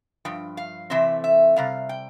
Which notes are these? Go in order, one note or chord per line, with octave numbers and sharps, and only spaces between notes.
G2 F3 G5
F5
C3 E3 A3 C4 E5
E5
C3 G3 F5
G5